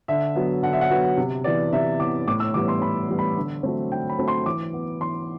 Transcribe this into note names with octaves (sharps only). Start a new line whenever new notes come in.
D3 E5
F#3 B3
D3 F#5
E5
F#5
F#3 B3
C3
E3 B3 D5
C3 E5
E3 B3 D6
A2 D6
E6
E3 G3 B3 D6
C6
A2 B5
E3 G3 B3
B5
D3
F#3 A3 C4
D3 G5
B5
F#3 A3 C4
C6
E3 D6
B3
E3 C6